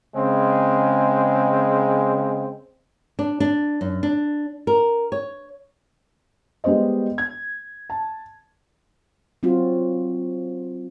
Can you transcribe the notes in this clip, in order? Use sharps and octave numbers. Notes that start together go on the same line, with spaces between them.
C#3 G#3 C4
D4
D4
F#2
D4
A#4
C#5
G3 G#3 B3 C5 D#5
G#6
A5
F#3 C4 F4 F#4